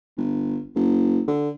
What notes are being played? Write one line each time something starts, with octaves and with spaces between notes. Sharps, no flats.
G1
F#1
D3